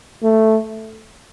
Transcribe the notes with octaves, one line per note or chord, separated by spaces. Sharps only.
A3